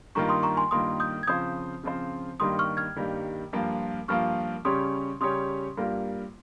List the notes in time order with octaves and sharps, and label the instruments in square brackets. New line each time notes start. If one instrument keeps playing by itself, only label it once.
[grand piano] G2 D#3 A#3 F4 [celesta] A#5 C#6
[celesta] C6 D#6
A#5 C#6
G#5 C6
[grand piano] G2 D#3 A#3 F4 [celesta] C6 D#6
[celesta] D#6 G6
G#6
[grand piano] C#3 F3 C4 F4 C5 [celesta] D#6 G6
[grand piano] C#3 F3 C4 F4 C5
[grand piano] G2 D#3 G3 A#3 [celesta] C6 D#6
[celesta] C#6 F6
F6 G#6
[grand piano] G2 D#3 G3 A#3
G2 F3 A#3 F4
[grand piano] G2 F3 A#3 F4 [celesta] C#6 F6
[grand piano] C#3 G3 C#4 G4 C#5 [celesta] C6 D#6
[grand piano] C#3 G3 C#4 G4 C#5 [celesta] C6 D#6
[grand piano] G2 G3 A#3 F4 A#4